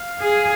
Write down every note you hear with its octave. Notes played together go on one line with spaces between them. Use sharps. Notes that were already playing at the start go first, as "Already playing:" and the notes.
Already playing: F5
G#4